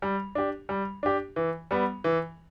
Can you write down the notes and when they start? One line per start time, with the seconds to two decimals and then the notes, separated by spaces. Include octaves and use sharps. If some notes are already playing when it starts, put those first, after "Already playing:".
0.02 G3
0.35 D4 G4
0.69 G3
1.03 D4 G4
1.36 E3
1.71 G3 B3
2.04 E3